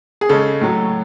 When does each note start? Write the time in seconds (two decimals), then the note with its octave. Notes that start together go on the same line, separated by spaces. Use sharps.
0.21 G#4
0.29 C#3 G#3 A4
0.61 A2 F#3